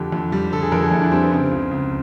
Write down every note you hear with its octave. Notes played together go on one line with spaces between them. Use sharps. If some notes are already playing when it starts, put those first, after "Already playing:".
Already playing: F2 D3 G4
F2
G3
D3 A4
G#4
F2 A#4
G#4
F2 E4
D4
G3 C4
B3
C#3 C4
C#2
C#2